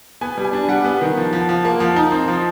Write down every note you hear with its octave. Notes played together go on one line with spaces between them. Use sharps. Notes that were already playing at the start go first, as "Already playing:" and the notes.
B3 G#5
G3
G#5
D4
G3 F#5
B3
D#3
F3
F3
F3
A#3
F3
D#4
C4
F3